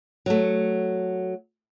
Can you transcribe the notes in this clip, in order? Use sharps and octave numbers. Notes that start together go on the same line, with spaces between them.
F#3 A3